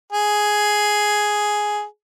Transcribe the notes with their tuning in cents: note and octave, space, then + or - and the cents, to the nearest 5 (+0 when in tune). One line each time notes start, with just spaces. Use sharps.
G#4 +5